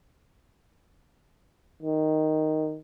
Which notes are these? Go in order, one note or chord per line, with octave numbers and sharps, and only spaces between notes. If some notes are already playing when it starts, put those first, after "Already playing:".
D#3